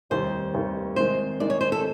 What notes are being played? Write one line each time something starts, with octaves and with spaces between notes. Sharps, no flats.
F1 D#2 D#3 G3 C5
F1 D#2 D#3 G3
C3 D#3 G#3 C5
C3 D#3 G#3 D5
C#5
C5
A4